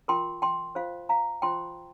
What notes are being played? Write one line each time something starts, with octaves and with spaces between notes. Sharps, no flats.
F4 A#4 G5 C6
G5 C6
F4 C5 F5
F5 A#5
F4 C5 G5 C6